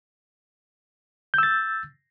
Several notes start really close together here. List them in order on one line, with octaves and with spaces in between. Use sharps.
G6 E6 A6